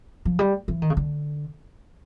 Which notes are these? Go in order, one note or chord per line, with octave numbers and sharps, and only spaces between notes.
F3
G3
E3
D#3
C#3
D3